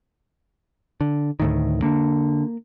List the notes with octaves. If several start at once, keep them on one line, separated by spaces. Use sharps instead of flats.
D3
D2 A2 D#3
D3 A#3